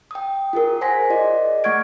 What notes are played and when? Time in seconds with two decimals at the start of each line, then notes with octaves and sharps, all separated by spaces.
0.11 G5 D#6
0.53 F4 G#4 A#4
0.81 C5 F#5 G#5 C6 A#6 B6
1.10 F4 G#4 D5 D#5
1.64 A3 F#5 C#6 F6 G#6 D7